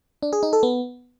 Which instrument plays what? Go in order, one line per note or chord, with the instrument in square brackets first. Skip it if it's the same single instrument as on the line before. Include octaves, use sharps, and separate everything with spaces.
[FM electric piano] D4
G#4
D#4
A4
B3